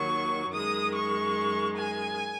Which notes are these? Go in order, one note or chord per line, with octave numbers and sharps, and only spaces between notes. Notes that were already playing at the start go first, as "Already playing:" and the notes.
Already playing: D#2 D#3 F#3 C#6
F#2 D#3 G#3 D#6
C#6
G#5